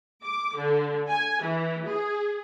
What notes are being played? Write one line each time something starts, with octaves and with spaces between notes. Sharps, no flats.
D6
D3
G#5
E3
G#4